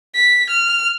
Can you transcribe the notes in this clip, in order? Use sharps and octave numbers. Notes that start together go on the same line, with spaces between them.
B6
F6